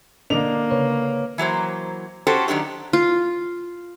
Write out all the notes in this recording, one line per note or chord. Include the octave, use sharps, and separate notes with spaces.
D3 A#3 D4 D#5 F7
C#3 B4 C#5
E3 F#3 A#3 C5
C#4 F#4 G4 A4 C5
D#3 E3 F#3 D4 G4
F4